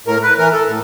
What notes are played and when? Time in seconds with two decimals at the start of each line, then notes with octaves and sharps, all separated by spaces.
0.07 A2 A#4
0.23 B4
0.38 E3 A#4
0.53 A4
0.68 A2